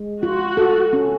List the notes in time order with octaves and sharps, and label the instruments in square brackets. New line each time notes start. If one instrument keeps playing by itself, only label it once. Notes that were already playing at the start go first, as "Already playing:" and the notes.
Already playing: [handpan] G#3
[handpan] F4 [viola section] F#4
[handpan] A4
C#4